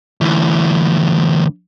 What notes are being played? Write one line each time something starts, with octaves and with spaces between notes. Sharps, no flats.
D2 E3